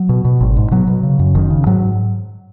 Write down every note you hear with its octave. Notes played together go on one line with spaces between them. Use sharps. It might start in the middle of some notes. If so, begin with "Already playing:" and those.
Already playing: F#3
B2
B2
G#1
G#2
B2 F#3
B2
C#3
F#2
F#1 D#3
C#3
G#2 F#3